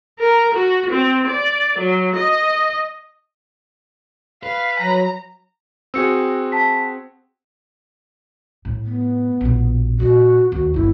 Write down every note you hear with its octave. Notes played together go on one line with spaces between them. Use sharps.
A#4
F#4
C4
D5
F#3
D#5
B4 F5
F#3 A#5
C4 F#4 G#4 E6 C#7
A5 B6
A2
B3
A#1 B2
A#2 F#4
D#2 F#4
G1 D#3 E4